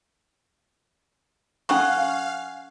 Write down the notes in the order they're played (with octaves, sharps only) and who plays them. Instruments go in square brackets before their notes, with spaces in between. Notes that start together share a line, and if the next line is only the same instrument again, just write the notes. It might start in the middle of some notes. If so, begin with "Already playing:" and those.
[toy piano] C#4 A4 C#6 [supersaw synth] F5 [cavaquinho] F#5 G#5